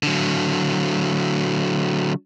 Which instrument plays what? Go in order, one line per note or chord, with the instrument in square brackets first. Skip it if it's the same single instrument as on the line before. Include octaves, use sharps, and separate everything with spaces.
[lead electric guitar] D3 F#3